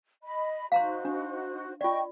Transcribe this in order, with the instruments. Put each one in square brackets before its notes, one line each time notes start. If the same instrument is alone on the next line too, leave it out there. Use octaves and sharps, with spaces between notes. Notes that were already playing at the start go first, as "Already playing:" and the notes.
[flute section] D#5 B5
[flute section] D#4 F#4 C5 [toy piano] F5 A#5 C6
[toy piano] D4
[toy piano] F4 D5 [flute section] D#5 G5 C#6